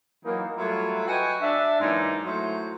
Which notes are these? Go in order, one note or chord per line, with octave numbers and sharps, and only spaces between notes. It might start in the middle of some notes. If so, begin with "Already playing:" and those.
E3 F#3 A#3 D#4
F#3 G3 A3 E4 F4
F#4 B4 D#5 G5 G#5
D4 E5
G#2 E3 F#3 G#3 A#3 D#4
F#3 A3 E4 C5